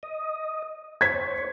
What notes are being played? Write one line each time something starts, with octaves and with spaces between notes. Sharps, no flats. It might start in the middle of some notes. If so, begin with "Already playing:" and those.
D#5
C5 C#5 G#6 B6